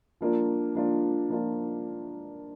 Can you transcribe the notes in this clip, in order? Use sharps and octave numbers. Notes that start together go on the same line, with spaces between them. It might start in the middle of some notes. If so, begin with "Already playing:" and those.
F3 A#3 D4 F4
F3 A#3 D4 F4
F3 A#3 D4 F4